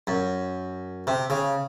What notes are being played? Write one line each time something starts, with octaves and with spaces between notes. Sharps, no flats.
F#2
C3
C#3